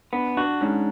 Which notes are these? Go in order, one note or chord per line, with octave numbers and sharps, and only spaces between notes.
B3 D4
D4 F#4
G#2 C#4